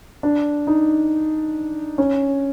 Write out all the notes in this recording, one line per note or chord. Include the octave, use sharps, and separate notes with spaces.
D4
D#4
C#4